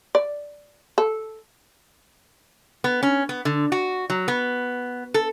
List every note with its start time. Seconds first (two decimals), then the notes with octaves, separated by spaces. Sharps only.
0.15 D5
0.98 A4
2.84 B3
3.03 C#4
3.29 B3
3.45 D3
3.72 F#4
4.10 F#3
4.28 B3
5.14 A4